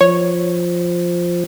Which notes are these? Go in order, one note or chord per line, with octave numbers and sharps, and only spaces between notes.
F3 C#5